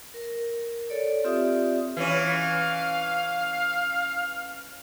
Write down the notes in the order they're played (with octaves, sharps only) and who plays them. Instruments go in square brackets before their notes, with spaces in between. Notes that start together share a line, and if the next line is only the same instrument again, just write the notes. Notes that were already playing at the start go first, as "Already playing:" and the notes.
[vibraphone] A#4
A4 C#5 D5
C4 F4 G4 D5 E5 D#6
[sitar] E3 C#4 [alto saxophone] F5